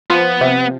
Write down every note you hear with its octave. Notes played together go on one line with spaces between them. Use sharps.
F3 B3
C3